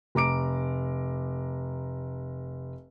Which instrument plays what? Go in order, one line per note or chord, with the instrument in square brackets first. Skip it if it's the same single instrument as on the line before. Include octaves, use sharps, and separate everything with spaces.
[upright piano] F1 A#5 D6 D7